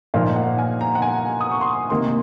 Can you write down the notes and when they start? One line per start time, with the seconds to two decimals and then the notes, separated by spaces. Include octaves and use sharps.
0.14 A#2 F3 A#3 D#4 F5
0.36 F#5
0.58 G#5
0.81 A#5
0.95 F#5
1.02 G#5
1.41 D#6
1.51 C#6
1.61 C6
1.90 C3 D#3 A#3 C6